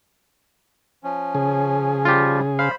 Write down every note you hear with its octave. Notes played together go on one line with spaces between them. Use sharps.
F3 C#4
C#3 G#4
F3 G3 F4 G4
C5 F5 B5